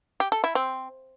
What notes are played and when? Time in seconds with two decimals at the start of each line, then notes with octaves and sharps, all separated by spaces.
0.20 G4
0.32 A4
0.44 E4
0.55 C4